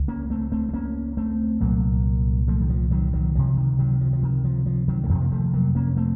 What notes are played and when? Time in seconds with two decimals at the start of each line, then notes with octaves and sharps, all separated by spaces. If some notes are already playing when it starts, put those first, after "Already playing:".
Already playing: C#2
0.08 A#3 C#4
0.30 A3 C4
0.52 A3 C4
0.69 C4
0.73 A#3 C#4
1.17 A3 C4
1.61 C2 A#2 F#3 A#3
2.48 F3 A3
2.61 D#3
2.70 F3
2.91 D#3 F#3
3.13 D#3 F#3
3.35 C#2 C3 F3
3.57 D#3
3.79 D#3 F#3
4.01 F3
4.13 F3
4.23 D#3
4.44 F3
4.66 F3
4.88 D#3 F#3
5.04 A3
5.09 F2 C3 D#3 F#3
5.21 A#3
5.32 F3 A3
5.53 F#3 A#3
5.75 A#3 C#4
5.97 A3 C4